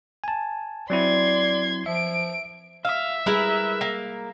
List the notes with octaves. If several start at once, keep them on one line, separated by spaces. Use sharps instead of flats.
G#5 A5
F#3 C4 E4 D5 C6 G#6
F3 E5 D7
E5 F5
G3 E4 G#4 A#4 B4
A#3